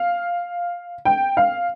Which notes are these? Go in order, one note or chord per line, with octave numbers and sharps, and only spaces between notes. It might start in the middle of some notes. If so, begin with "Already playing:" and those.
Already playing: F5
G5
F5